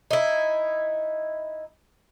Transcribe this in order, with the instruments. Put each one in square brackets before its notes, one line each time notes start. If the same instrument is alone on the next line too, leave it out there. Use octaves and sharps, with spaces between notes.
[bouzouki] D#4 E4